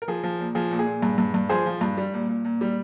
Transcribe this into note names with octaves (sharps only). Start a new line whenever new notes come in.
A#4
F3 G#4
F3
A#2
F3 G#4
A#2
G#4
A#2
G2
G2
G2
F3 G#4 C5
F3
G2
G3
A#2
A#2
A#2
G3